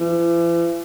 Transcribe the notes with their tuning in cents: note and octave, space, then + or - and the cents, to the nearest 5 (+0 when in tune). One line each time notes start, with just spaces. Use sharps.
E3 +45